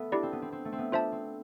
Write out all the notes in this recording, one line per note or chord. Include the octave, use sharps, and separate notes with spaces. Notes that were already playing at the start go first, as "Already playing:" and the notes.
Already playing: A3 B3
D4 E4 G4 D5
C4
B3
C4
C4
A3
C4
B3
D4 F4 C5 E5 A5
C4